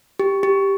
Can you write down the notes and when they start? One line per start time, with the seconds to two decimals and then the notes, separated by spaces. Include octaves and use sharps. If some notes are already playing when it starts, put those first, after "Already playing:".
0.19 G4
0.43 G4